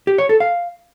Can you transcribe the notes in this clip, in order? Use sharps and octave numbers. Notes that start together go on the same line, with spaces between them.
G4
C#5
A4
F5